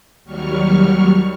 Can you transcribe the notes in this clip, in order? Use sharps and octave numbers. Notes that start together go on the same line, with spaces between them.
D#2 F#3 G3 C#6 F6